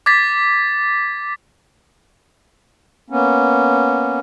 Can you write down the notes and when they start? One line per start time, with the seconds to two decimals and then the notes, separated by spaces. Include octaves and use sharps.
0.06 D6 G#6 A6 B6
3.10 A#3 B3 C#4